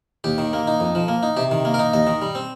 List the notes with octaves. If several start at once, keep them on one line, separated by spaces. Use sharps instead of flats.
D#2 G4
D#3
A#3
D#4
F2
F3
A#3
D#4
C3 G4
D#3
A#3
A#4
D#4
D#2 D#5
D#3
G3
C4